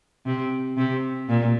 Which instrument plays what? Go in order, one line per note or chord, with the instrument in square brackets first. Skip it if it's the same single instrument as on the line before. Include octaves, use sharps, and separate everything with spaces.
[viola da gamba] C3
C3
A#2